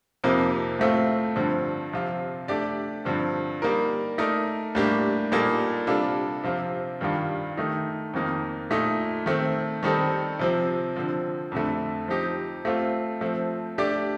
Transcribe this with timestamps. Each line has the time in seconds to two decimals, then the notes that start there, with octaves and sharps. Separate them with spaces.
0.24 F2 C3 F3 A#3 D#4
0.79 A2 A3 C4 F4
1.36 G2 D3 F3 C4
1.93 C3 F3 C4 F4
2.48 A3 D4 G4 D5
3.05 G2 D3 F3 C4
3.62 G3 A#3 D#4 A#4
4.18 A3 D#4 A#4 D5
4.75 A2 G3 A#3 D4 G4
5.32 A#2 G3 A#3 D#4 A4
5.87 C3 G3 D4 F4 A4
6.43 C3 F3 C4 F4
7.01 G2 D#3 G3 D4 F4
7.57 D#3 A3 D#4
8.13 F2 D#3 A#3 D#4
8.70 A#2 A3 D#4
9.26 D#3 A3 C4
9.83 D#3 G3 C4 D#4 A4
10.39 C3 F3 C4
10.96 D3 F3 C4
11.52 F2 D3 A3
12.08 F3 C4 D#4 G4
12.65 A3 C4 F4
13.21 F3 A3 C4
13.78 A3 D4 G4 D5